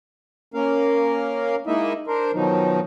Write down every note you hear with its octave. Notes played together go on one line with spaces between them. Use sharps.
A#3 C#4 A#4 F5
G#3 A#3 D#4 E4 D#5 E5
D4 A#4 C5
B2 D#3 F3 F#3 D#4